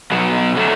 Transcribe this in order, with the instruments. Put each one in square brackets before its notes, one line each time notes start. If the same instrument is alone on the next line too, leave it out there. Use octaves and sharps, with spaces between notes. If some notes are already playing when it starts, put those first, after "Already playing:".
[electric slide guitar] B2 F#3 B3
D3 F#3 A3